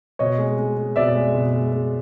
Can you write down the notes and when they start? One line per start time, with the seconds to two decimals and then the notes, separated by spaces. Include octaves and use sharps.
0.19 B2 C#5 D#5
0.38 G#3
0.57 G#3
0.77 G#3
0.96 B2 D5 E5
1.15 G#3
1.34 B2
1.53 G#3
1.72 G#3